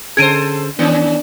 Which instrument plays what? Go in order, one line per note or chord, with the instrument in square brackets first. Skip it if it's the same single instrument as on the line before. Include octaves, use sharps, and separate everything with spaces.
[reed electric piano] D3 C#4 G#4 [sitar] A4 C5 [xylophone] G#6 D7 D#7
[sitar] D#3 C#4 [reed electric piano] B3 [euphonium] D4